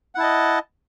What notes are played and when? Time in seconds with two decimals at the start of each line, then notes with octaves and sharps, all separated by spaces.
0.15 F#5
0.18 E4
0.20 A5
0.23 D#5